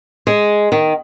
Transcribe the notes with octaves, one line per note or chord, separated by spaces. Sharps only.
G#3
D#3